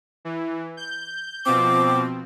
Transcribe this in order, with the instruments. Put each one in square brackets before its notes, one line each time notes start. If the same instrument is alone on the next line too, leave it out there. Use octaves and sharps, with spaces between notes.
[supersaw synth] E3
G6
[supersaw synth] B2 F3 C4 [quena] D6